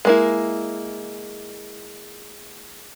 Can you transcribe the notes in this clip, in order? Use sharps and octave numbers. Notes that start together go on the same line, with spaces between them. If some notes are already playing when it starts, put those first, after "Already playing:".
G#3 A#3 E4